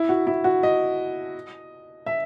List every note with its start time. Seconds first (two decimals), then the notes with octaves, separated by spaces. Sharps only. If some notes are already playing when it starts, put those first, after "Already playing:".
Already playing: E4
0.09 F#4
0.27 E4
0.44 F#4
0.63 D#5
2.06 E5